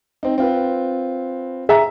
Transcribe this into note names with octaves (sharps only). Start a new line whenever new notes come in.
C4 D#4
C4 F4 B4
G#4 E5 A#5